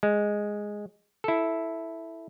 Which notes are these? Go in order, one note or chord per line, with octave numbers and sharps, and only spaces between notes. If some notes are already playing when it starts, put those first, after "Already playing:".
G#3
E4 A4